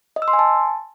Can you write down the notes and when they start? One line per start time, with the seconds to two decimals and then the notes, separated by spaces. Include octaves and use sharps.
0.16 D#5
0.22 E6
0.28 C6
0.33 G#5
0.39 A5